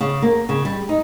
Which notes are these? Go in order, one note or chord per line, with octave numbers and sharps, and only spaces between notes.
C#3
A#3
C#3
G3
D#4